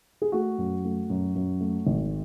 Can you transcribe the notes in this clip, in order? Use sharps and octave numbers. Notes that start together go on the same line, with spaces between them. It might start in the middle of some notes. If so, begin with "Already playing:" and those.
G#4
A3 F#4
F#2
A3
F#2
F#2
A3
G#1